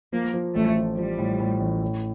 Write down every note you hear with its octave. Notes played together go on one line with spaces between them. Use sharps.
F3 A#3
F3
A1 A3
F3
F3 G3
A2
A2
A1
A2